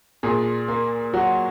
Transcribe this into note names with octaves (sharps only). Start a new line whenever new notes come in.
A#2 G#4
A#3
F#3 F#4